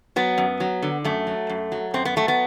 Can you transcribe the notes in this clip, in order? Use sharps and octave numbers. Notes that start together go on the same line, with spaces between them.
F#3 B3
F#2
F#3
D3
F#2 A3
F#3
F#2
F#3
F#2 C4
B3
F#3 A3
B3